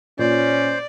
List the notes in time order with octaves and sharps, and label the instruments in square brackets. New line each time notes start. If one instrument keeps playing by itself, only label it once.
[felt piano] A#2 [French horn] C#4 [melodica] C5 [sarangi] D5